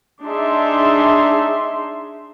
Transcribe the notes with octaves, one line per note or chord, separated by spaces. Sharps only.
D4 D#4 G#4 E5 C6